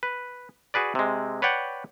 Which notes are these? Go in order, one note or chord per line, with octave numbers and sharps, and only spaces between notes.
B4
F#4 G#4 B4 D5
C3 G#3
B4 C#5 D5 F#5 G5